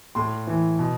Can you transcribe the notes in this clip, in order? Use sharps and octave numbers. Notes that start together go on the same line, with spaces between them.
A2 C6
E3
B2